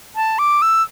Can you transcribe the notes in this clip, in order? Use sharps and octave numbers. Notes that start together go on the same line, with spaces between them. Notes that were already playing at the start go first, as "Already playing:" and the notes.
A5
D6
E6